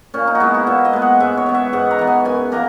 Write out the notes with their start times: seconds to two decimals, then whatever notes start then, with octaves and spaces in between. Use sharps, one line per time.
0.14 A#2 C#4
0.27 D#4
0.35 F#4
0.40 G#3 B3 E4
0.54 F#4
0.67 A#2 E5
0.85 D#5
0.93 G#3 B3
1.02 F#5
1.20 G#2 E5
1.37 C#5
1.46 E3 B3
1.55 E5
1.73 G#2 F#5
1.91 A#5
1.99 E3 B3
2.07 G#5
2.25 F#2 G#5
2.52 E3 A#3 A#5